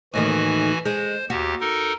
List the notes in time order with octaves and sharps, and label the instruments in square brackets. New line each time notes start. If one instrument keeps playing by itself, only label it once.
[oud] D#2 A2 D#3 [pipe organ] E3 F#4 G#5
[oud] G#3 [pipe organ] C5
[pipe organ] D#2 G4 [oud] F#4
[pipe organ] D#4 A4 A#4